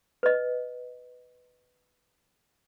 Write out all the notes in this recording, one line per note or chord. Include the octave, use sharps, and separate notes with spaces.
B4 D#5